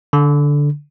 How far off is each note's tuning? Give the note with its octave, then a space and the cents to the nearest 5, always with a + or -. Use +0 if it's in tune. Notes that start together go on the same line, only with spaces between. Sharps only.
D3 -10